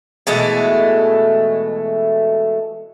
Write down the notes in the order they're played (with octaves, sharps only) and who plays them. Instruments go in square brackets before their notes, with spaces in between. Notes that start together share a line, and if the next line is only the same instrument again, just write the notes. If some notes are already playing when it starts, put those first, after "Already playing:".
[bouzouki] B2 E3 G#3 A3